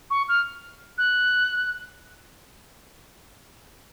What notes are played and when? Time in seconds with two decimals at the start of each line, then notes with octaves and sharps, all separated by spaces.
0.10 C#6
0.29 F6
0.98 F#6